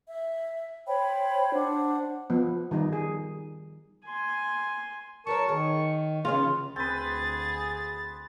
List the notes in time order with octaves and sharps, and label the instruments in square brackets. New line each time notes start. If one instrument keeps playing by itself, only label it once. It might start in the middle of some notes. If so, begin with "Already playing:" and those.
[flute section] E5
C5 C#5 G5 B5
D4 C5 F#5
[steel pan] F3 B3
D#3 G3 D#4
G#4
[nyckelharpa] G#5 C6
[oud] F#3 B4 C#5 [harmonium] A#4 A5 [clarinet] C#6
[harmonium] D#3 [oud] G#4
[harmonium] C#3 [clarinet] E3 [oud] B3 C#4 G#4 [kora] F4
[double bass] D2 [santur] C4 B4 [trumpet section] G#4 [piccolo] A6